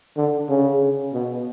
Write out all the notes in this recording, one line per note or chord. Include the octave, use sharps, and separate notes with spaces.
D3
C#3
B2